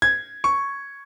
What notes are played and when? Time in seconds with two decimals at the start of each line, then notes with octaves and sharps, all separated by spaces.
0.02 G#6
0.44 C#6